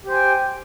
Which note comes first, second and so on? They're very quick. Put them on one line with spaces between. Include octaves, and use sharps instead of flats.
G4 C5 G#5 G5